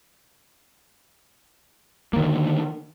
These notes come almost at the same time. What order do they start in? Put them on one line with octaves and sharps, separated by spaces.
A#3 D#3 D3